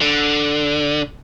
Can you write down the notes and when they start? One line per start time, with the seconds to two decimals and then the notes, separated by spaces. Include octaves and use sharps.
0.01 D3